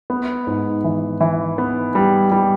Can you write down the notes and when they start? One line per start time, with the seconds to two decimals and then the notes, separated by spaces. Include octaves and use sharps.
0.10 B3
0.47 G#2
0.84 E3
1.21 E3
1.58 B3
1.95 G3
2.31 G3